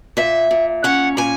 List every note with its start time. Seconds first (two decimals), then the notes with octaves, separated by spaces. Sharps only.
0.17 A#2 E5
0.51 A#2
0.84 C#4 F#5
1.17 A#2 G#5